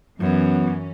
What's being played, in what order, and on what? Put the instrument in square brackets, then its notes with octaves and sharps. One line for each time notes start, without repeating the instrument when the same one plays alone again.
[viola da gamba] F#2 [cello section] E3 C#4 [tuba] F#3 [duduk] B3